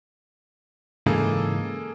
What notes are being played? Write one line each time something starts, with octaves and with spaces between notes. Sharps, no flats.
G#2 C#3 E3 A#3 G#4 A4